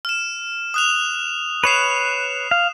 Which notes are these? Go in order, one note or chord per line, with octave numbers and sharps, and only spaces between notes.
F6 E7
D#6 F#6 F7
B4 C#5 C7 E7 F7
F5